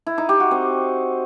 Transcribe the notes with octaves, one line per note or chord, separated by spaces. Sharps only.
E4
D#4
G4
F#4
C4